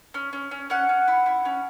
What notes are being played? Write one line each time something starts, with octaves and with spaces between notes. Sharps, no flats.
C#4
C#4
C#4
C#4 F#5
C#4
E4
E4
C#4